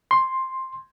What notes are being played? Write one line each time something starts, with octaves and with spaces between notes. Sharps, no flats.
C6